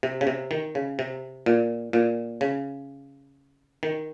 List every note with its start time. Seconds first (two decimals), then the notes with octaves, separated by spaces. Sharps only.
0.03 C3
0.21 C#3
0.27 C3
0.51 D#3
0.75 C#3
0.99 C3
1.46 A#2
1.93 A#2
2.41 C#3
3.83 D#3